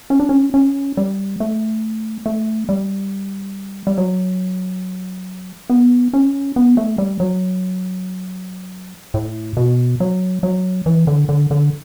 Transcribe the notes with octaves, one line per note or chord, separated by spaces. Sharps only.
C#4
D4
C#4
C#4
G3
A3
A3
G3
G3
F#3
B3
C#4
B3
A3
G3
F#3
A2
B2
F#3
F#3
E3
D3
D3
D3